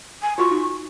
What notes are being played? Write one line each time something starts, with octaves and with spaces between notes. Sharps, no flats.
G#5
F4 F#4 C6 C#6
D#4 F#4